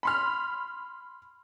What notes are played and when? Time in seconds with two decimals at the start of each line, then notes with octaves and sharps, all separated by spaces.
0.03 B5 C6 F6